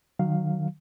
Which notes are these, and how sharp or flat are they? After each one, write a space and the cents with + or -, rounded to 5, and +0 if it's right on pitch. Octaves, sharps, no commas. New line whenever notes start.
D#3 -30 F#3 +0 F5 +0